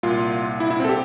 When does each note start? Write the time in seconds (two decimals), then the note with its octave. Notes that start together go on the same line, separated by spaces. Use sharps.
0.03 C2 A#2 F4
0.60 E4
0.70 E4
0.80 C4
0.84 A4
0.89 G4